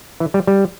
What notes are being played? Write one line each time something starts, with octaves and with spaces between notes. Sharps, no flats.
E3
G3
G3